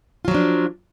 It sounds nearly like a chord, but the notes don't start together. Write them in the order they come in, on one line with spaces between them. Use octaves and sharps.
F4 F#3 F3 D4